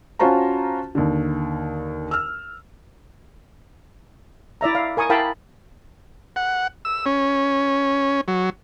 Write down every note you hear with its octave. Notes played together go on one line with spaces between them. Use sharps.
C#4 F4 F#4 C5 A5 A#5
D#2 D3
E6 F6
E4 D5 E5 A#5
F5
A#4 G#5 C#6 D#6
E4 A#4 F5 G5 A5 B5
F#5
E6
C#4
F#3